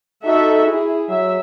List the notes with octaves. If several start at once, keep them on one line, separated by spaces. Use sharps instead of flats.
D#4 F#4 A4 E5
E4 G#4
F#3 E5